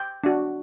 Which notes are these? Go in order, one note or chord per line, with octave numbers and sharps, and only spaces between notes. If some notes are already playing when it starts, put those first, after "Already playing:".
Already playing: G5
D4 F#4